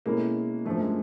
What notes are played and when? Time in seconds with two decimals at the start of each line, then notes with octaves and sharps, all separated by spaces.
0.06 B2 G#3 A#3 C#4 E4 A4
0.65 F#2 D3 F3 A3
0.81 G#3